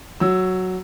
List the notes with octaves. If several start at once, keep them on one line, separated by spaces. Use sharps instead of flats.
F#3 E6